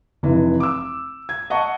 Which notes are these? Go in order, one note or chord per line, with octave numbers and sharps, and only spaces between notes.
F1 E3
D6 E6
G#6
D#5 F#5 A5 C#6